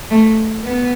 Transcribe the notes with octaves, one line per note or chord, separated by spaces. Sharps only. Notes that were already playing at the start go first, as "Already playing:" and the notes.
A3
B3